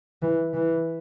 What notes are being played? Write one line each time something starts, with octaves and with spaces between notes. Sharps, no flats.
E3
E3